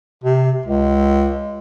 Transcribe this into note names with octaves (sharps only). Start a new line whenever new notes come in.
C3
C#2